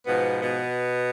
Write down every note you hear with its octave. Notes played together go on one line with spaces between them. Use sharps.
G#2 B2 F3 B3
B2 B3